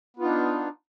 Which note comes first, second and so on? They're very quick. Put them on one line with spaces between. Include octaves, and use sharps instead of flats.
B3 F4 D#4 D4